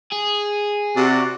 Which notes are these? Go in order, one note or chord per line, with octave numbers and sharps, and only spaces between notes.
G#4
C3 F#4 D5